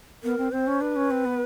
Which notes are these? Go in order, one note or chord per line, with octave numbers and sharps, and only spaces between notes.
B3 A#4
C4
C4 C5
C#4
D4 B4
C#4
C4
B3